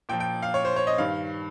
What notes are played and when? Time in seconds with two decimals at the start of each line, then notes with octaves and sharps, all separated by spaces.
0.09 A#2 G5
0.12 F3
0.20 G5
0.42 F5
0.54 C#5
0.65 C5
0.76 C#5
0.87 D#5
0.98 G2 D#3 F5